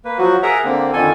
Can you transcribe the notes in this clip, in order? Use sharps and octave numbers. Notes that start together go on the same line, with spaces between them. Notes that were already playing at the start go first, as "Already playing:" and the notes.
A#3 B4
F3 F#3 F#4
G#4 A#4 E5 F#5 A#5
D3 A#3 C4
F2 D3 D#3 A4 G#5